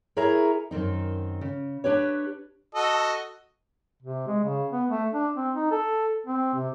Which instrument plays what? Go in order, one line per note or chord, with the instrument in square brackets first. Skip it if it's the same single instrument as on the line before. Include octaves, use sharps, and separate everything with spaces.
[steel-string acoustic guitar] E4 G#4 A#4 C#5 E5 A#5
F#2 D#3 C4 D#4
C#3
D4 G4 B4 C#5
[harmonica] F#4 A4 D#5
[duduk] C3
G#3
C#3
B3
A3
D4
C4
D#4
A4
C4
C3